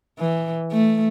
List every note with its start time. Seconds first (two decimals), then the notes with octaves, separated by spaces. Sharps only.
0.19 E3
0.72 A3